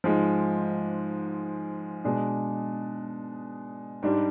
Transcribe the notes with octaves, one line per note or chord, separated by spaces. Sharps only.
G#2 F3 G#3
B2 G#3 D4
G#2 G3 D4